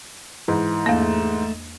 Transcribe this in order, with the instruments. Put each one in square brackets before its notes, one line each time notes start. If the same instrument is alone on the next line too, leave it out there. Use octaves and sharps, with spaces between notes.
[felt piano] G#2 E3
[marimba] E2 A#3 [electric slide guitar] A3